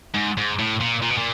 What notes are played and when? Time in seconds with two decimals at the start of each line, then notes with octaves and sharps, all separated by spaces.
0.15 G#2
0.38 G#2
0.59 A2
0.81 A#2
1.02 A#2
1.10 B2
1.18 A#2